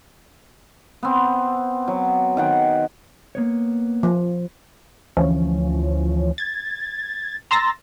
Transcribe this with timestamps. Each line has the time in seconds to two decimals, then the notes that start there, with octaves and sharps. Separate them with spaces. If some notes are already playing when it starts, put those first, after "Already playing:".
1.03 B3 C4
1.88 F#3
2.37 D#3 F#5 G5
3.35 A#3 B3 C#5
4.03 F3
5.17 D2 E3 F3 C#4
6.38 G#6 A6
7.51 A#5 C6 E6 A6 A#6